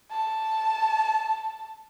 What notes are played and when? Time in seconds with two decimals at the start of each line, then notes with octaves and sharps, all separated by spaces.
0.11 A5